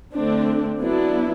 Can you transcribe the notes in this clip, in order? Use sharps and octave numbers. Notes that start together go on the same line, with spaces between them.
D3 A3 C4 D4
F#3 B3 D4 E4